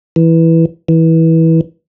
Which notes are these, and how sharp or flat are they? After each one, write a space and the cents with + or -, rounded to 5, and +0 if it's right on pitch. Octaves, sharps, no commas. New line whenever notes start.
E3 -5
E3 -20